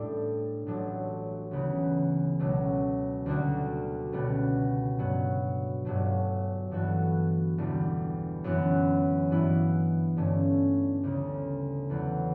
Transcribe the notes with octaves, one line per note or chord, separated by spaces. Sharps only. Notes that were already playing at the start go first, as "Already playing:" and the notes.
Already playing: A2 G3 D4 A4
A1 A2 F#3 A3 D4
D2 C#3 E3 B3
C#2 B2 F#3 A3
D2 D3 G3 D4 F#4
C#2 B2 G3 B3
G2 F#3 B3
G1 G2 F#3 A3
G2 E3 B3 F#4 A4
E1 E2 D3 G3
F#2 E3 B3
G2 E3 B3 E4
G2 D3 A3 C#4
D2 C#3 G3
E2 D3 F#3 B3